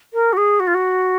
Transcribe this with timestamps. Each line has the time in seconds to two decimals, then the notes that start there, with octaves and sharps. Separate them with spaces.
0.13 A#4
0.33 F#4
0.37 G#4
0.60 F#4
0.67 F4
0.74 F#4